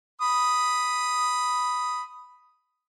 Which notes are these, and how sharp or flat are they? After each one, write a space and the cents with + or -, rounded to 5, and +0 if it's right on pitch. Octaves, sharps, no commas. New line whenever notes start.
B5 +0 D#6 +0